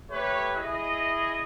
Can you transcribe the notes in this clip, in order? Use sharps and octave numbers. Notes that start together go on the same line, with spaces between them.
A3 G4 B4 C#5
E4 G#4 D#5